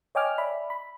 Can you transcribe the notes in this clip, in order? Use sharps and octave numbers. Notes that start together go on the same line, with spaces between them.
C#5 D#5 G5 G#5 D6 F6
D5 E5 B5
B5